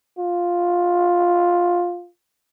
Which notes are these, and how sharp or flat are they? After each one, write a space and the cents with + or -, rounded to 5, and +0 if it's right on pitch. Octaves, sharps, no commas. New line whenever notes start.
F4 +10